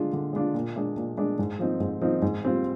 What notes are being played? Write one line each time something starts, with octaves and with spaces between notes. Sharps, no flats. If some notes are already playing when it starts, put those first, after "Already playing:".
Already playing: D3 G#3 D4 F4
D3
G#3 D4 F4
A#2
G#3 D4
A#2
G#3 D4
G#2
F3 C4 D#4
G#2
F3 C4 D#4
G#2
G3 C4 F4